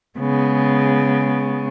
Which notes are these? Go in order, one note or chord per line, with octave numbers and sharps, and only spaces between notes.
C#3 G#3 B3